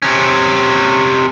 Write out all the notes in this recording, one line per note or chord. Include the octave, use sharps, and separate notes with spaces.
C3 C#4